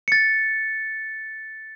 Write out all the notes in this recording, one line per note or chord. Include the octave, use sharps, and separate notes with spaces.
A6 C#7